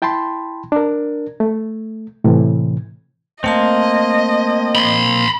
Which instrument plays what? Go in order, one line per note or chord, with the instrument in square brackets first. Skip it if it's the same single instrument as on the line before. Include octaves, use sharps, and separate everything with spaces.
[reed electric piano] E4 G5 A5 B5 C6
D4 A#4
A3
A2 C3 E3
[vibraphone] A3 A5 C6 [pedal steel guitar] A#3 C4 [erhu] D#5
[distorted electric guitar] B5 C6